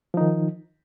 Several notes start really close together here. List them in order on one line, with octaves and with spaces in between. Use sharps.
F3 D#4 D#3